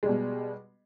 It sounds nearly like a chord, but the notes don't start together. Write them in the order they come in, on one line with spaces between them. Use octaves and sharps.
G#3 G3 B2